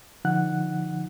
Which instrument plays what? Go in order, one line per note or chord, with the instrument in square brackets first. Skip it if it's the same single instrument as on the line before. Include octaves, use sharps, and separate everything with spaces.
[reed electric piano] D3 F3 D#4 F#5 F#6